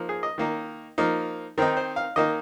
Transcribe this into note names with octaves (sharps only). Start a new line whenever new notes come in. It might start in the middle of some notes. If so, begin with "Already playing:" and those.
Already playing: F3 A#3 D#4
G#4
D#5
D#3 A#3 D#4
F3 A#3 D#4
D#3 C4 D#4 A#4
C5
F5
D#3 A#3 D#4 D#5